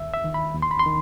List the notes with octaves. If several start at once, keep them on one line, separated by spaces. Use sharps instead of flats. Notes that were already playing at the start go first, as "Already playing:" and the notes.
Already playing: D#2 E5
E5
D#3
B5
D#2
C6
B5
C6
D#3